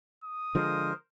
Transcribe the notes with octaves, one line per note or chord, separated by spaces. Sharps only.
D#6
D3 F3 G#3 A#4 C5